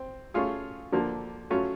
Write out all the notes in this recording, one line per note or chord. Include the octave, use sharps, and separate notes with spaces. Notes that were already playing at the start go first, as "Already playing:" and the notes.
Already playing: C4
A3 C#4 F4 G#4
D3 F3 A#3
F#3 A3 C#4 F4